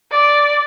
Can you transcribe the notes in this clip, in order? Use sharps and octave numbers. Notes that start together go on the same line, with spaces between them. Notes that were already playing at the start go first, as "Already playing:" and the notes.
D5